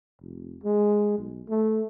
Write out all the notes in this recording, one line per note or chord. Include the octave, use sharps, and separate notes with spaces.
F1
G#3
B1
A3